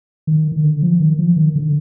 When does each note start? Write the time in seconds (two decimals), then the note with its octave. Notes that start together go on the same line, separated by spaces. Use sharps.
0.27 D#3
0.52 D#3
0.64 D3
0.83 F3
1.00 D#3
1.19 F3
1.37 D#3
1.56 D3